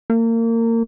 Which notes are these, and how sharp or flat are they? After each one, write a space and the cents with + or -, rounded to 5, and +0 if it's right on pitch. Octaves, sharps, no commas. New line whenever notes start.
A#3 -30